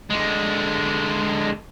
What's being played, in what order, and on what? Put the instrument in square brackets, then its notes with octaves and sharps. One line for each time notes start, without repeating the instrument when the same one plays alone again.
[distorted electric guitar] D3 G#3